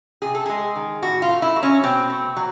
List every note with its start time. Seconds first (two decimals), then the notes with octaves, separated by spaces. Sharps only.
0.22 C3 G#4
0.35 A4
0.46 G#3 G#4
0.76 D#3
1.02 A2 F#4
1.22 F4
1.29 A3
1.42 E4
1.56 F#3
1.63 C#4
1.83 B2 C4
2.10 A3
2.36 F#3